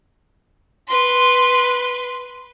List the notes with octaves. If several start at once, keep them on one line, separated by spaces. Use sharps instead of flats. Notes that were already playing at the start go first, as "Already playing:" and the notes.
B4 C6